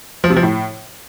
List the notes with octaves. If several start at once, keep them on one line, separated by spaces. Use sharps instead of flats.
F3
C3
F3
A2